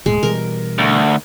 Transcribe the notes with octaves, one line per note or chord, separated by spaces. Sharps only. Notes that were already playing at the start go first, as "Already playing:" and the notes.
E1 D2 A2 G#3
B2 E3 G3 A#4
D2